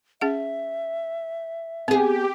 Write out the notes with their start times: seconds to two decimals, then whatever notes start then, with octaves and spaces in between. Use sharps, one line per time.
0.21 C#4 G#4 E5 F#5
1.88 B3 C4 G4 G#4